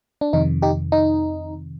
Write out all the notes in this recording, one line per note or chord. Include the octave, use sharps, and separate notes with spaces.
D4
F2 C3 D#3 D#4
D#4 G4
D#4